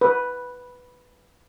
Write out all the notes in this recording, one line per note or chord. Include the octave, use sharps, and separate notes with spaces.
B4